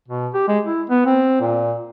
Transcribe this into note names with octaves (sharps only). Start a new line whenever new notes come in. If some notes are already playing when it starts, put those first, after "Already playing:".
B2
G4
G#3
E4
B3
C4
A#2